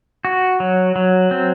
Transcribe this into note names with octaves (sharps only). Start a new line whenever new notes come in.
F#4
F#3
F#3
C4